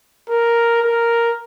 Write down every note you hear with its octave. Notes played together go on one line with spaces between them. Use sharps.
A#4
A#4